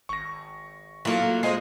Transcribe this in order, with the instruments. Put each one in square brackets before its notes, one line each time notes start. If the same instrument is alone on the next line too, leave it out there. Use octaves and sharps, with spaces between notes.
[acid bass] G#1 [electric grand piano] C#6 A#6
[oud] F#3 A#3 [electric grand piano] E4 F4 A4
[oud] G#3 [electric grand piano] C5 D#5 C7